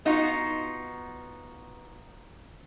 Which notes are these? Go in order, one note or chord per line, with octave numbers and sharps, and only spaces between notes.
B3 D#4 F4 F#4